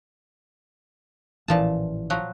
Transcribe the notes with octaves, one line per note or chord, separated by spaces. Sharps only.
A1 A#2 E3 F3 A5
F3 F#3 F#4